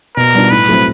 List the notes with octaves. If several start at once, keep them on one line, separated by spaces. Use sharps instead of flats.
B2 A#4
G3 B3 D4 F4
A2 B4
F#3 A3 C4 E4